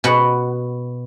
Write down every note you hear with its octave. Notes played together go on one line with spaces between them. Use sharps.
B2 B4 F#5